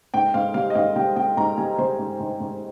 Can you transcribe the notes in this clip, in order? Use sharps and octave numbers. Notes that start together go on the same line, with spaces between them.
G#2 G5
G#2 F5
G3 F5
D#5
G#2 F5
G3 G5
G3 G5
G#2 A#5
G3 G#5
G3 C5
G#2
G#2
G#2